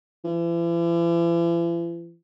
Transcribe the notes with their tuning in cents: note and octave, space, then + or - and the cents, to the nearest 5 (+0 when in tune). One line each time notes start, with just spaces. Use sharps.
E3 +45